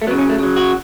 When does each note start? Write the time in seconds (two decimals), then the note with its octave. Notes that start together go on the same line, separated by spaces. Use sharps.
0.02 A3
0.07 F#3 B3
0.11 C#3
0.19 C#4
0.29 A3
0.39 C#3 F#3
0.56 F#4